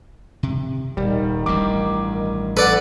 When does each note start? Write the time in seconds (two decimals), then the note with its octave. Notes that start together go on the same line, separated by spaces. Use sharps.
0.43 C3
0.97 D#1 D#3 G3
1.46 A1 G2 G3 D6
2.57 A4 B4 D5 F#5